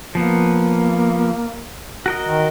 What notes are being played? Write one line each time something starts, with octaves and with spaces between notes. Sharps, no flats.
F3 A#3 B3
F#4 A#4 D#5
D#3